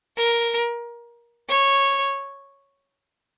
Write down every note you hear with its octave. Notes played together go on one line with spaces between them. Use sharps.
A#4
C#5